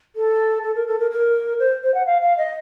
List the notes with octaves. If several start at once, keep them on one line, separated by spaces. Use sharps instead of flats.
A4
A4
A#4
A4
A#4
A#4
C5
C5
F#5
F5
F5
D#5